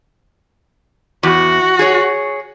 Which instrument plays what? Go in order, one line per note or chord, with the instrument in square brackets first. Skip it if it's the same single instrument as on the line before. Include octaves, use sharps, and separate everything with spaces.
[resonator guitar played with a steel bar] E2 [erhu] F#4
[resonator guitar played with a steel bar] G#4 C#5